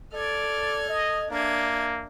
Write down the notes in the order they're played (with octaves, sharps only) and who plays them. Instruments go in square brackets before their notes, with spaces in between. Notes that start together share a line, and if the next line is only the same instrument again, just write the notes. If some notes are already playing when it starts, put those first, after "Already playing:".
[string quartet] A4 F6 G#6 [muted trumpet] D5
[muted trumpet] D#5
[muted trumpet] A#3 [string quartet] D4 E5 G#6